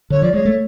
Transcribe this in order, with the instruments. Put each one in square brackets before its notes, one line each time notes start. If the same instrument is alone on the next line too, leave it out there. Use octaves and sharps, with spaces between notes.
[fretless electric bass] D3 [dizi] C#5
[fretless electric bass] F3 [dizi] D5
[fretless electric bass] G#3 [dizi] C#5
[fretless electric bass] A3